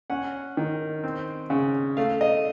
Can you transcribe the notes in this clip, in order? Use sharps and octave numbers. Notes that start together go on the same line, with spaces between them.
C#4 F#5
D#3
C4
C#3
A3 F5
D#5